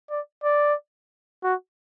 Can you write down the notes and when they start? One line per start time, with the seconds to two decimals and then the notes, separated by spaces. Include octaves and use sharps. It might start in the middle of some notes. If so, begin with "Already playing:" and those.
0.10 D5
0.44 D5
1.44 F#4